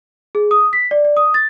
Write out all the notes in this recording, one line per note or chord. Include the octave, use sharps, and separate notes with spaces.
G#4
D#6
B6
D5
D5
D#6
A6